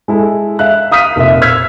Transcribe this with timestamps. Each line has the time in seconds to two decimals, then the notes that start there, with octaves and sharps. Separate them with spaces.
0.08 G#3 E4 A4
0.59 E5 F5 F#6
0.91 F5 D#6 F6 B6 D#7
1.16 F1 A#2 E5
1.42 E6 F6 G#6 B6